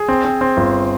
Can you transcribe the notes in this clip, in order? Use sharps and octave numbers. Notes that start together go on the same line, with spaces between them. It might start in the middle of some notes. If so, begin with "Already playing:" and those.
Already playing: G#4
C4
C4
C4
G1